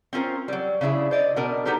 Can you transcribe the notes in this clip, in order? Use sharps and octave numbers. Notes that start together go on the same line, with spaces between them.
C4 C#4 F4 A#4 C5
F#3 G3
C#3 D4 E4 G#4
C5 D5 D#5
B2 D4 A#4
B3 D#4 G4 A4 A#4 C5